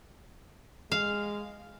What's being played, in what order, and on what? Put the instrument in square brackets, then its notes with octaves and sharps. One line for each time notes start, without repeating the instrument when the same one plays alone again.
[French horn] G#3 [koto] F5